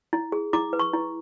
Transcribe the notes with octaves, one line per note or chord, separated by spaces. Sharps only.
E4
G#4
E4 D6
B4
C#6
E4